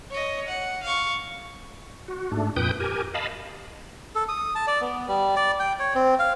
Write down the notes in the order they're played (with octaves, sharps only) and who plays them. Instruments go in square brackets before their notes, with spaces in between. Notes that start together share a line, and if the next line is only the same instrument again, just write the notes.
[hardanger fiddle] C#5 D#5
F#5
F5 C#6
[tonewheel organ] F#4
G#2 A3 D4
F2 A#2 B4 G5 D#6 G6
G4 A#4 G#5
D#5 F5 A5 B5
[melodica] A4
D#6
A5
D5
B3
G3
D5
G5
C#5
C4
F5